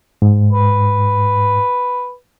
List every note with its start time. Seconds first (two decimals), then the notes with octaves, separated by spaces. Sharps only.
0.22 G#2
0.52 B4